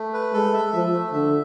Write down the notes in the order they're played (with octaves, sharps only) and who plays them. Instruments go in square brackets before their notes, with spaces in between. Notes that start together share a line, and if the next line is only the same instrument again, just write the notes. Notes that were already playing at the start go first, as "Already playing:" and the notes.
Already playing: [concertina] A3
B4
[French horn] G#3 [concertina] A4
[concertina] E5
[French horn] F3 [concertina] E5
[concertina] A3
[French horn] D3 [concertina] E5